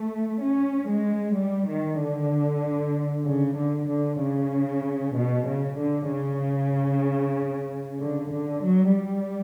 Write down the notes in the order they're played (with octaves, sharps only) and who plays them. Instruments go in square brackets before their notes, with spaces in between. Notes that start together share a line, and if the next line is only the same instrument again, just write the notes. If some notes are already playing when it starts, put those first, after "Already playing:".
Already playing: [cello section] A3
C#4
G#3
G3
D#3
D3
C#3
D3
D3
C#3
B2
C#3
D3
C#3
D3
D3
F#3
G3